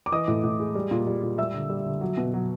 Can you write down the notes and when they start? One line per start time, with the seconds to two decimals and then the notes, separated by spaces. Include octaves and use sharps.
0.06 D6
0.12 E3 D#5 D#6
0.28 A2
0.44 A2
0.60 G#3
0.75 G3
0.91 A#2
1.07 G3
1.23 A#2
1.38 G3 E5 E6
1.54 D3
1.70 G3
1.86 D3
2.01 F#3
2.17 B2
2.34 F#3